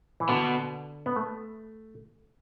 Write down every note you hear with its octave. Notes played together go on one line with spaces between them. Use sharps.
E3
B2 D3
B3
A3